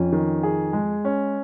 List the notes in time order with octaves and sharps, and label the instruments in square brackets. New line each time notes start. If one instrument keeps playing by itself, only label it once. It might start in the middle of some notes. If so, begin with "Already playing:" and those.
Already playing: [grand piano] F2 F3 [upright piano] C#4
[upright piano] D#3
G#4
G#3
C#4